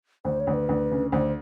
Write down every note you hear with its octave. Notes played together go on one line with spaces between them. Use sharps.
D2 C5
C#5
D2
B4
D2
C#3
D2 C5